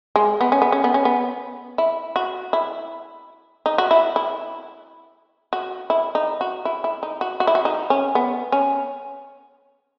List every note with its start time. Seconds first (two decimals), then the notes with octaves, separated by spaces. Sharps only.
0.16 G#3
0.41 B3
0.52 C#4
0.62 B3
0.72 C#4
0.84 B3
0.94 C#4
1.05 B3
1.78 E4
2.16 F#4
2.53 E4
3.66 D#4
3.78 F#4
3.91 E4
4.16 E4
5.53 F#4
5.90 E4
6.15 D#4
6.41 F#4
6.65 E4
6.84 E4
7.03 D#4
7.21 F#4
7.40 F#4
7.47 E4
7.55 F#4
7.65 D#4
7.90 C#4
8.15 B3
8.52 C#4